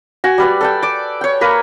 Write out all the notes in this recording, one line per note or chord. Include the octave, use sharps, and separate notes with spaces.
F#4 G#5
G3 B4 D5
A4 D5 G5
D5 D6
C#5 G5
A#3 A#4 B4